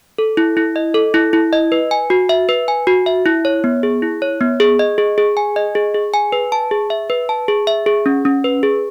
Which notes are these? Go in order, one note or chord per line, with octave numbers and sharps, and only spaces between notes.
A4
E4
E4
D#5
A4
E4
E4
D#5
B4
G#5
F#4
E5
B4
G#5
F#4
E5
E4
C#5
B3
G#4
E4
C#5
B3
G#4
D#5
G#4
G#4
G#5
D#5
G#4
G#4
G#5
B4
A5
G#4
E5
B4
A5
G#4
E5
G#4
C#4
C#4
B4
G#4